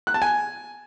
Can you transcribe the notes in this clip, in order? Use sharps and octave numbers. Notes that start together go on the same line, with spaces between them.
F#6
A5
G#5